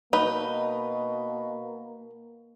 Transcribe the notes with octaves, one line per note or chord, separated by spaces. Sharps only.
B2 A#3 D#4 B4